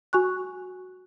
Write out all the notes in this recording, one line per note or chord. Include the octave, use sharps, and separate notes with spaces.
F#4 G#5 C#6 F#6